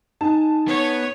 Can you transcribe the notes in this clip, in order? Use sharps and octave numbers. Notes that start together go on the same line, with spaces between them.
D#4 G#5 A5
B3 C#5